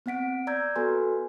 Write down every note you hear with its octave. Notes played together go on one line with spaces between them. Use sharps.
B3 C4 F#5 B6 D7
D5 A#5 E6 G6 G#6
B3 F#4 A4 B4 G#5 C6